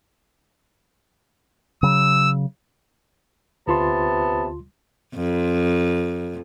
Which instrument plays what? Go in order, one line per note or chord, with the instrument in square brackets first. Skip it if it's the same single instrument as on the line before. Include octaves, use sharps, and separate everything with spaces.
[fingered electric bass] C#3 F#3 [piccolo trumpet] E6
[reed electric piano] D2 F4 C6 [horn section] C3 B3 A5
[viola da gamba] F2